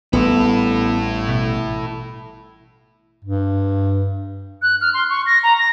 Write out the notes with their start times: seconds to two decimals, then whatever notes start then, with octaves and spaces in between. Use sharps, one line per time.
0.13 A1 G3 B3 E4 A4
1.29 B2
3.25 G2
4.62 F#6
4.81 F6
4.94 C6
5.10 C#6
5.26 A#6
5.43 A#5
5.59 A#6